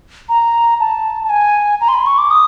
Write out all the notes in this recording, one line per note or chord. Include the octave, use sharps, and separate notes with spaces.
A#5
A5
A5
G#5
A#5
C6
B5
C6
C#6
D6
D#6